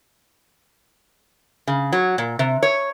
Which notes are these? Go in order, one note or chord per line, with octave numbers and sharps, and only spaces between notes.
C#3
F#3
A#2
C3
C#5